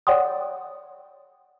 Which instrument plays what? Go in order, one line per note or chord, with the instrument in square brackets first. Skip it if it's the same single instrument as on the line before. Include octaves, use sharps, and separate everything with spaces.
[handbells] C#5 D5 F#5 G5 C6 D#6